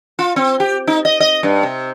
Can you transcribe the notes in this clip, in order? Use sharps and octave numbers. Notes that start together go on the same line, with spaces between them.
F4
C4
G4
D#4
D#5
D#5
G2
C3